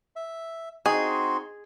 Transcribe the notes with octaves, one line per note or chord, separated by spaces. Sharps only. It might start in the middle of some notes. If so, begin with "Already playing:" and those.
E5
C4 D#4 F#4 G#4 C6